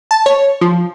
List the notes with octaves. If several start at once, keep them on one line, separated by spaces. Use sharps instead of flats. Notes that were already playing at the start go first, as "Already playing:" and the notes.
A5
C#5
F3